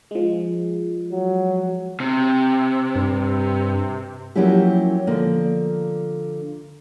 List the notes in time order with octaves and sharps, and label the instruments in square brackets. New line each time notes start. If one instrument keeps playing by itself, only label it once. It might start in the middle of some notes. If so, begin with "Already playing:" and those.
[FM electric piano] F3 G#3
[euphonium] F#3
[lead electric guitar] C3
[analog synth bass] G2
[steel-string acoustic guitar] F3 F#3 A#3 C#4 E4 G4
D3 F3 A#3